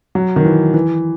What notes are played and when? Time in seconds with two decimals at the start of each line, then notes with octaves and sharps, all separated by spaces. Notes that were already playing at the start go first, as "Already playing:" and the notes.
0.15 F#3
0.36 D#3
0.45 E3
0.74 E3